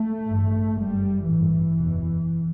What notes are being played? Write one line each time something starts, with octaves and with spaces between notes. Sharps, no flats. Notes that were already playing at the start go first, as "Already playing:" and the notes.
Already playing: A3
A1 G2
F#1 F#2 G3
A1 G2 E3
F#1 E2 B2